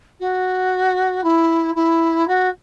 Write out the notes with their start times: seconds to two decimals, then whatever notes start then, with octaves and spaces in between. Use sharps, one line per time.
0.19 F#4
1.23 E4
1.75 E4
2.27 F#4